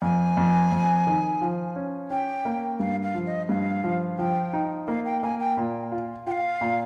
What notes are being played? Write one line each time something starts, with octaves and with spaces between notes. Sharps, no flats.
F2 G#5
F2
F2
D#3
F3
C#4
C#4 G5
A#3
G2 F5
F5
F3
D#5
G2 F5
F3
F3 G5
D#4
A#3 F5
G5
A#3 G#5
G5
A#2
F4
F4 F5 G5
A#2